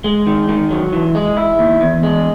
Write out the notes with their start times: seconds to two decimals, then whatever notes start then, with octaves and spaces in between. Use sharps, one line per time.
0.04 G#3
0.27 D#3
0.49 D#3
0.71 F#3
0.93 E3
1.15 G#3
1.37 E4
1.59 D#2
1.81 E2
2.03 G#3